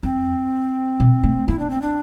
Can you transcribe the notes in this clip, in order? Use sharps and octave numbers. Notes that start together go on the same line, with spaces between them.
F2 C4
B2
A3
B3 E4
D4
C4
D4